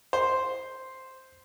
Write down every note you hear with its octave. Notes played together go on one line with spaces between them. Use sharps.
C5